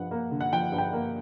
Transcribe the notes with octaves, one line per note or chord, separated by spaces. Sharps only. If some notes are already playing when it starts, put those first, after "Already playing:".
Already playing: G2 F3 F#5
A#3
D3
F#5
F3 G5
G2
G5
A#3